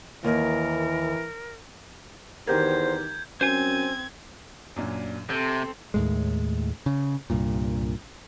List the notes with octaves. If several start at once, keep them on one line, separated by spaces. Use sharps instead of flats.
D#2 E3 A#4
E2 D#3 G4 A#4 C5 G6 G#6
F#2 C4 C5 G#5 G#6
F#2 A#2 D4
C3 C4 A4 G6
D#2 A2 G#3
C#3
C2 G2 A#2